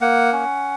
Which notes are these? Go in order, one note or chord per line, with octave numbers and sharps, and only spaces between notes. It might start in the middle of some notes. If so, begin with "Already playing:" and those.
A#3 F#5
C#4